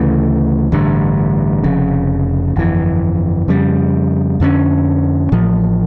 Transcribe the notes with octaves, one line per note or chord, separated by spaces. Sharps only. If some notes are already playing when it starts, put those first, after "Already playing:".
Already playing: D2 C#3 E3 A3
A1 G2 D3
F1 F2 C#3
G1 F2 E3
F2 C#3 G3
F2 D3 G3 C#4
A1 A2 F3